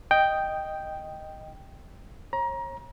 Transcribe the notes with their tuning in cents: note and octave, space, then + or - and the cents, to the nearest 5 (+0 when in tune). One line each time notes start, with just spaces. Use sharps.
D#5 +0 G5 +0
C#5 -40 A#5 +25